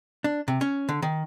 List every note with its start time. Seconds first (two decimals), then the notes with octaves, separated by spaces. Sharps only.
0.24 D4
0.48 C3
0.61 C#4
0.89 D3
1.02 D#3